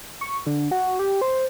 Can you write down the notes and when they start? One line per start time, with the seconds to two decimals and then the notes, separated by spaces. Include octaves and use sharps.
0.21 C#6
0.46 D3
0.71 F#4
0.99 G4
1.21 C5